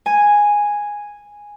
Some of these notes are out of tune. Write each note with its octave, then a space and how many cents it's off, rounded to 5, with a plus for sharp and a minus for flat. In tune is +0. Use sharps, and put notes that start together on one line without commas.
G#5 -5